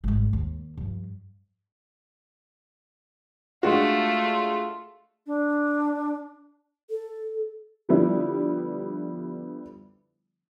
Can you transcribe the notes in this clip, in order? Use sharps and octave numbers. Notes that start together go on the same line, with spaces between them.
G#1 G#3
D#2
G2 F3
G#3 A3 D4 F4 F#4
D4
A4
D3 F3 G3 B3 E4